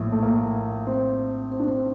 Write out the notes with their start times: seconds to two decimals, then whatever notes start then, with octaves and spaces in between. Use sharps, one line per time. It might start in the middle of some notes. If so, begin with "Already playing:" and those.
Already playing: A#1 A2
0.12 A3
0.23 A#3
0.87 C4
1.51 C4
1.60 D4
1.67 C4